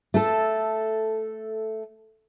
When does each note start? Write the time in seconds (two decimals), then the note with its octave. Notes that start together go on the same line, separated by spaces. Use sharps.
0.14 A3 A4